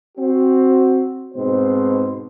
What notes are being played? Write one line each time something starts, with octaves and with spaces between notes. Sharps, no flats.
C4 F#4
G#2 B2 C4 C5